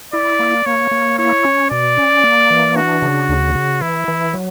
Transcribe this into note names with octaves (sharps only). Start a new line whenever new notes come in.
E4 D5
A#3
A#3 C#5
A#3
E4 C#5
C#4
B2 D5
C#4
A#3
E3
D4 F#4
C#3
D2
C#3
E3 E4
E3
F#3